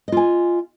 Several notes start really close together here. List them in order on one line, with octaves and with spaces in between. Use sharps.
D#5 F4 G#5